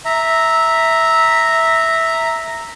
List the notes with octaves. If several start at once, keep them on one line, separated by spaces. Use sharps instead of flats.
E5 A#5